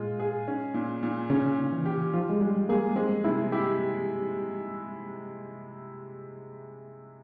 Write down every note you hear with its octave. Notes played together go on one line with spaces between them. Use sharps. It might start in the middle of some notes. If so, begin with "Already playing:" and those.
Already playing: A#2 G#3 F4
G#4
C#4
A#2
A#2
C#3 C#4
A#2
E3
G4
F3 F4
G#3
G3 G#3
A#3 G#4
G#3 C4
C3 E4
E4 G4